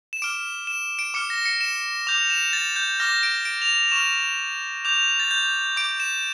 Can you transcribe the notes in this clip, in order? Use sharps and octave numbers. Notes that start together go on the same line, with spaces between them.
E7
D6 F6 D7
E7
D7
D6 F6 C#7
A#6
C#7
E7
D6 G6 F7
E7
A6
G6
D6 F6 A#6
D7
D7
F7
F7
C#6 F6 E7
D6 G6 F7
F7
A6
G6
D6 G6 D7
E7